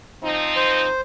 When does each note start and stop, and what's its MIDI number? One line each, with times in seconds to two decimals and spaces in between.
0.23 0.88 53
0.23 0.88 60
0.23 0.88 63
0.56 1.01 72